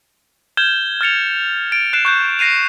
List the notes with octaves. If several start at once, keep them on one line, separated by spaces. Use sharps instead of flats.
F6 G6 G#6 E7 G7
F6 A6 C#7 F7
A6 D7
F#6 C7 D7 E7
C#6 F#6 G6
A#6 C7 D#7 F7